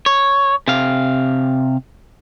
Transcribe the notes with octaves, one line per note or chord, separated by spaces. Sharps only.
C#5
C3 F5